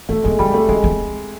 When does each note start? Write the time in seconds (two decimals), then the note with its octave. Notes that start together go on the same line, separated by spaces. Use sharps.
0.09 A3 C4
0.24 G#3 B3
0.39 G3 C4
0.54 A3
0.69 G#3 C#4
0.84 C4